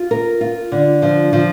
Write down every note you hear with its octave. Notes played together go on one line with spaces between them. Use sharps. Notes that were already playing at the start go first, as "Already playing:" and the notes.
Already playing: F4
A#4
F4
D3
F3
F3